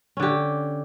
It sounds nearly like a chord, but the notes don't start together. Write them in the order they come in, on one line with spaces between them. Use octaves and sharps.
C#4 D3 G4